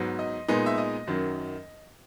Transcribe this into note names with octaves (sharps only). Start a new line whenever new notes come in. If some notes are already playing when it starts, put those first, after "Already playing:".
Already playing: G#2 F#3 B3
D#5
A#2 G#3 B3 D#4
E5
D#5
F#2 D#3 F#3